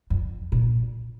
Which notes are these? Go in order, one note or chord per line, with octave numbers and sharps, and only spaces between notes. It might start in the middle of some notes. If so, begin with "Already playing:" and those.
F2
A#2